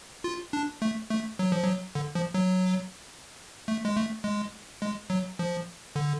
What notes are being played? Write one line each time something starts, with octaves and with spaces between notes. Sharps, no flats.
F4
D4
A3
A3
F#3
F3
F#3
D3
F3
F#3
A3
G#3
A3
G#3
G#3
F#3
F3
D3